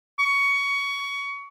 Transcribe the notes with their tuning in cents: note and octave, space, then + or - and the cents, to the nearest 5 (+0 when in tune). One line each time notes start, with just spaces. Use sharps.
C#6 +20